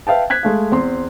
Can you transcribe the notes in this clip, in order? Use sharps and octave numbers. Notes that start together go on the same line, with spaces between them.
B4 E5 F5 G5 A5
F#6 G#6 B6
G#3 A3 F5
E2 C4 C5 C6